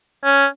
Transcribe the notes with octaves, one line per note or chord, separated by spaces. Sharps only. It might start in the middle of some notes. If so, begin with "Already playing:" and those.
C#4